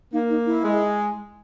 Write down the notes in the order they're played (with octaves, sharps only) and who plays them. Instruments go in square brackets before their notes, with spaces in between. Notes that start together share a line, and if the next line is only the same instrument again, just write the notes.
[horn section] A#3 [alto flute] D#4
[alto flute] D#4
E4
[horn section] G#3